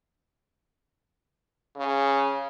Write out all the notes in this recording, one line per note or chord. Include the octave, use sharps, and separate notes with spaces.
C#3